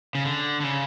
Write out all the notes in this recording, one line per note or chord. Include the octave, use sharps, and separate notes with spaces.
C#3
D3
D3
C#3